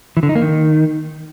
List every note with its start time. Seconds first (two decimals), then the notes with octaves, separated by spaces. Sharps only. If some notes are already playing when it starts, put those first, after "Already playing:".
0.17 E3
0.23 D3
0.29 D#4
0.35 A#3
0.42 D#3